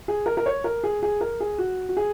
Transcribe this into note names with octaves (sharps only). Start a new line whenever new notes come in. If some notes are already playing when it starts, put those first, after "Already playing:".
G#4
A#4
A#4
C#5
A#4
G#4
G#4
A#4
G#4
F#4
F#4
G#4